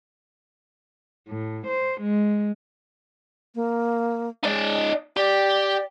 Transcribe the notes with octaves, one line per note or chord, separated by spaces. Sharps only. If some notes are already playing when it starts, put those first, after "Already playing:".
A2
C5
G#3
A#3
G#3 D#4 D5
G4 D5